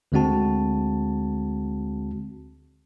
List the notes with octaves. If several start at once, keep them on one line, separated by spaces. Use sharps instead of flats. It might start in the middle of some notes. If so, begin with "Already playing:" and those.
D2 D3 G#3 C4 F#4 A5